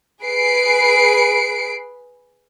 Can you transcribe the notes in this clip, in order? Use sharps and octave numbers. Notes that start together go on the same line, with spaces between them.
G#4 B4 C7 D7